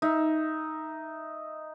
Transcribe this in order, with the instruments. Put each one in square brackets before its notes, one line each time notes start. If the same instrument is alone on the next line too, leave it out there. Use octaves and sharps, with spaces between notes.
[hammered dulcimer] D#4 E5